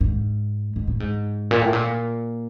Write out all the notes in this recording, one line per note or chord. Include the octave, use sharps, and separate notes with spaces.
G#2
G#2
A2
G#2
A#2
A2
A#2